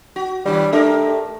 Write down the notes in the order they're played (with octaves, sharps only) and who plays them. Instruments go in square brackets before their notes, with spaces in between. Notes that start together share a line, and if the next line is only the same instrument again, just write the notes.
[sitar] F#4
[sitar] G2 D#3 [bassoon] G3
[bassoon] A3 [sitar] D4 G4 A#4